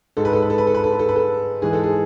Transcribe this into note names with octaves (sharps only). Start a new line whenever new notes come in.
G#2 G#3 A4
B4
A4
B4
A4
B4
A4
B4
A4
B4
A4
B4
A4
G#2 E3 G#3 G#4
A4
G#4